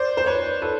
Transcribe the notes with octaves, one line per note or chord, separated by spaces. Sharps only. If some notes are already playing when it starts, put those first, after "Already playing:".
Already playing: C5 D5
C5
B4 C#5
A4 B4